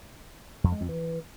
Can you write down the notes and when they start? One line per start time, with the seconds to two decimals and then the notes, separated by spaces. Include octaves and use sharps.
0.64 F2
0.72 G#3
0.81 F2
0.89 E3